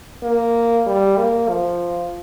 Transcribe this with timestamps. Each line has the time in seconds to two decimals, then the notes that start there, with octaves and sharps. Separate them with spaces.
0.23 A#3
0.87 G3
1.18 A#3
1.49 F3